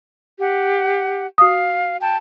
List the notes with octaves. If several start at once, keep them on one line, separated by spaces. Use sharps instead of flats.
G4 F#5
F#4 F5 D#6
G5 A5